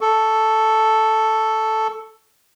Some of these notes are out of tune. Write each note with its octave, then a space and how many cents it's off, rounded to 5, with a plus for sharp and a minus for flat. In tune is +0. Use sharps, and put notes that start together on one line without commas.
A4 +0 C#6 +15